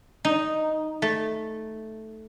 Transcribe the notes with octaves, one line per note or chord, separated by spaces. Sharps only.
D#4
A3